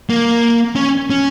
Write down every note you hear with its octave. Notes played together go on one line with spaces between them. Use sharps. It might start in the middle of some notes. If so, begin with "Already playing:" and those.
A#3
C#4
C#4